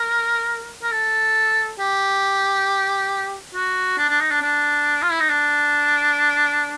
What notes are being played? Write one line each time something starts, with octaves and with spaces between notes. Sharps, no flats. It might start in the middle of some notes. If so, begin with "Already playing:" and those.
Already playing: A#4
A#4
A4
G4
F#4
D4
D4
D#4
D4
D4
F4
E4
D#4
D4